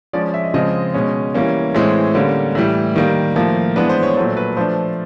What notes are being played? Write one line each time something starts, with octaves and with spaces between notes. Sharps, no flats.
F3 G#3 C#4 D5
E5
D#5
C#3 F3 G#3 C4 D#5
B2 G#3 C#4
E3 G3 A#3 C#4
A2 E3 G#3 C4 C#5
D3 G3 A#3 C#4
A2 E3 G3
D#3 G3 A#3
A2 F3 A#3
E3 G#3 B3 D4 B4
C5
C#5
A#2 F#3 A3 C5
B4
F3 A3 D4 C5